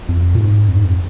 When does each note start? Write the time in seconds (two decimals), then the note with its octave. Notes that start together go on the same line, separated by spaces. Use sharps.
0.09 F2
0.35 A#2
0.39 G#2
0.68 F2
0.76 G#2
0.84 F2